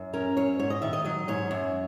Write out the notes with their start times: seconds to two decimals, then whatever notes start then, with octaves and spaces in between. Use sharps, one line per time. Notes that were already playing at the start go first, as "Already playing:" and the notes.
Already playing: F#2
0.13 C#4 A#4
0.37 F#2 C#5
0.59 G#2 C#5
0.70 D#5
0.82 D#3 E5
0.93 D#5
1.04 F#3 D#5
1.28 G#2 C#5
1.51 F#2